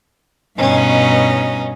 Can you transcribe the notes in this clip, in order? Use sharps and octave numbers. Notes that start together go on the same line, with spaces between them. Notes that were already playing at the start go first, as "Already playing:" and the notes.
G2 B2 C#4 D#4